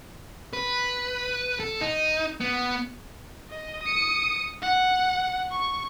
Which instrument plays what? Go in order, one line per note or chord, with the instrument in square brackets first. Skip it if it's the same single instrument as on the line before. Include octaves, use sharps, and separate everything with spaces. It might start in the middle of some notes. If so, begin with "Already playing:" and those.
[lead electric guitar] B4
A4
D#4
B3
[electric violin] D#5
D#6 C#7
F#5
C#6